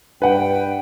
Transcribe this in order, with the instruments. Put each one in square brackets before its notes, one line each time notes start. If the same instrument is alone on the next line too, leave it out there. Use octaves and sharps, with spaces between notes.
[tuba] G2 [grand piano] B4 F#5 [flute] G5